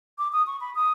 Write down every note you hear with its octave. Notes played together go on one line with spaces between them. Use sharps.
D6
D#6
C#6
B5
D#6